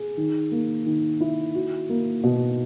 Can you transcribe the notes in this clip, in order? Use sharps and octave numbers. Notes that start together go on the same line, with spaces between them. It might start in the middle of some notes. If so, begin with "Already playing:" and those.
Already playing: G#4
D#3
A#3
D#3
E4
F#4
A#3
B2